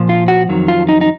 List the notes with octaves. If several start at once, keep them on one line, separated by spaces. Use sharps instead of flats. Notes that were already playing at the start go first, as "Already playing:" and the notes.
Already playing: A#2 F3
F4
F#4
F2 D#3 F#3
F4
D#4
D#4